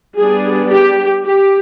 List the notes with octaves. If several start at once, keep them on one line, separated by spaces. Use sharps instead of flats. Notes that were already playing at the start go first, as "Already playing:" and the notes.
G3 B3 D4 G#4
G4
G4